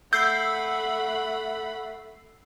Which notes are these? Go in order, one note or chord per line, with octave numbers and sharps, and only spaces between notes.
A3 F#5 B5 E6 G6 C7